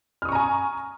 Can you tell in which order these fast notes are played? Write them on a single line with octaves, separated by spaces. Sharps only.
F6 D#6 C#6 A#5 G#5